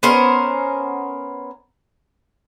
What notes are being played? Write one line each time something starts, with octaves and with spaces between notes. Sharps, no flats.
B3 C#4 A#4 C5